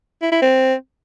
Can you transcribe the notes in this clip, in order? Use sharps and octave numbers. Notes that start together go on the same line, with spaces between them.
E4
E4
C4